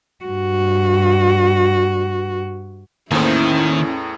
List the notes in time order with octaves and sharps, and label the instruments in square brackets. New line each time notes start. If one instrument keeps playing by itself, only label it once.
[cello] G2 F#4
[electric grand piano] E2 A2 [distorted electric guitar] D#3 [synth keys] A#3 C5 [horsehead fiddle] C#4 E4